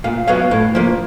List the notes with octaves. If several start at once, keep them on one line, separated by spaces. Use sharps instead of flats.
A#2 F5
F#3 B3 F5
A2
F3 A#3